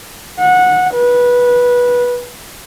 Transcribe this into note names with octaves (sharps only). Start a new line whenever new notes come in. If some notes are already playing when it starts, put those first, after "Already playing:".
F#5
B4